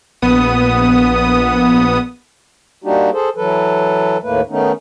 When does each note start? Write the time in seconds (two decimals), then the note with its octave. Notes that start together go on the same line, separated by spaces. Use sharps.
0.22 A#1 B3 D#6
2.84 G3 A#3 D4 D#4 F#4 G4
3.13 G#4 A4 C5
3.36 E3 F#3 A4 B4
4.23 D#2 A2 A3 A#3 B4
4.50 D#3 A3 B3 C#4 D#4